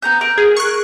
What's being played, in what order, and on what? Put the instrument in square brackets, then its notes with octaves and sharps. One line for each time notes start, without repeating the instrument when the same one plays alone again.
[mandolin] B3 A#5 G6
A#4
[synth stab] G#4
C#6 F#6